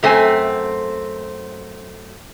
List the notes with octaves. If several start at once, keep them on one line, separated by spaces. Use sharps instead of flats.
F#2 A3 C4 G#5